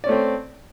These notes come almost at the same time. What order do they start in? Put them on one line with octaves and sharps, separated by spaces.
D5 C#4 A3 C4